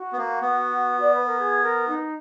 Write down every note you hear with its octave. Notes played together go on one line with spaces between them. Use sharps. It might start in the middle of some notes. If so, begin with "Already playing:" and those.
Already playing: F#4
B3
A#3
B3
D5
B4
A#4
G#4
A#4
D#4